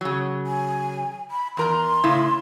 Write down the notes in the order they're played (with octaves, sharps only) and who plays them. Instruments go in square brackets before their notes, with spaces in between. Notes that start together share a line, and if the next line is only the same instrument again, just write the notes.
[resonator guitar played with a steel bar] C#3 F#3
[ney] G#5
B5
[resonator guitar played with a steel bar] E2 A#4 A#5 [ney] C6
[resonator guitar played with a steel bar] A2 C#3 E4